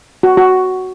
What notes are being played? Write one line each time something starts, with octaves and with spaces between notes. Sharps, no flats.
F#4
F#4